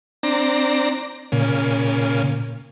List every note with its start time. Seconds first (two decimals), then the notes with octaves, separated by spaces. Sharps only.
0.23 C4 D4 A#5
1.32 A#2 C#3